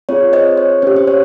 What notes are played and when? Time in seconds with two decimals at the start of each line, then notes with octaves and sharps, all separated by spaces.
0.09 C4 F4 G#4 C#5
0.33 C5 D#5
0.57 C#5
0.82 C#4 G4 C5
0.96 C5
1.07 C#5